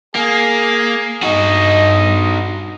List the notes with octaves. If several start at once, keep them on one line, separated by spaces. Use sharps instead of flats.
A#3 G#4
G2 D#4 F#4 D#5